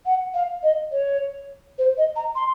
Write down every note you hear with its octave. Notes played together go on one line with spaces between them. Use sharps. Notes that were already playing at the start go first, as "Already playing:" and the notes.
F#5
F5
D#5
C#5
C5
D#5
A#5
C6